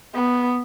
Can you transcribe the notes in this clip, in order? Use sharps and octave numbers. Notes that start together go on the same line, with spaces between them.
B3